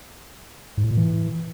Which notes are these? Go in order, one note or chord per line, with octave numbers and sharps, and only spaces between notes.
G#2
A2
A#2
E3